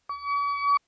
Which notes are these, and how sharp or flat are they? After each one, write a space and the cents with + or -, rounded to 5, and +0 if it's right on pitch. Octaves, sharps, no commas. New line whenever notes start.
C#6 +45